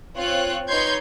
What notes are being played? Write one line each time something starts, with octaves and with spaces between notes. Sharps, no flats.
C4 F4 C#5 F#6
D#4 B4 C#5 C6 G6 G#6